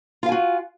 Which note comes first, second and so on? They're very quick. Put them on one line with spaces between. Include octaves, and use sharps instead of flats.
F4 F5 G#5 F#4